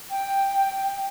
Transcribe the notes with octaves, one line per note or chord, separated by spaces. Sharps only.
G5